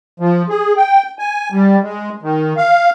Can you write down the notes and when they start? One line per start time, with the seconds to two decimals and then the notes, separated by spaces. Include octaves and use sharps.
0.20 F3
0.49 G#4
0.77 G5
1.19 G#5
1.52 G3
1.83 G#3
2.23 D#3
2.57 F5